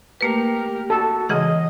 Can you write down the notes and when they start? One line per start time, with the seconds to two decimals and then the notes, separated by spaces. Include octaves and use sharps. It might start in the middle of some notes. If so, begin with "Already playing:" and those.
0.21 A3 A#3 G4 A#4 B4
0.90 F#4 A4
1.29 C#3 E3 G#3 D#5 F#5